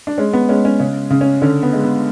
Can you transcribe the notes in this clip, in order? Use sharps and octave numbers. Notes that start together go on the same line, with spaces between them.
D4
G#3 C#4
B3
G#3 C#4
C#4
C#3 C#4
C#3
C#4
D3 C#4
B3
G#3
B3